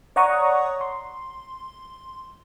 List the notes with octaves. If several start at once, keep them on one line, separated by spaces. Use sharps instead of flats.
C#5 D5 F#5 A#5 C#6 D#6
C6